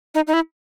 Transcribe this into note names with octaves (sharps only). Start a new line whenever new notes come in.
D#4
D#4
E4